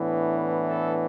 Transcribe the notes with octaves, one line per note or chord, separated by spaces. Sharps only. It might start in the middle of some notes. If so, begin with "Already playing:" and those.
Already playing: A2 E3 B3 D4
A4